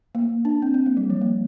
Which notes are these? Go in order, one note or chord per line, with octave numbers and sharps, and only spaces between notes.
A#3
D4
C4
C4
A#3
G3
F3
A#3